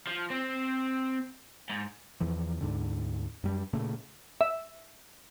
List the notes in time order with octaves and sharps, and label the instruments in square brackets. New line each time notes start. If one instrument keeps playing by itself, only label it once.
[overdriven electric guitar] F3
C4
G#2
[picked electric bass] E2 E3 F3
D2 G#2 D3
F#2 G3
A#2 C#3 A3
[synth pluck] E5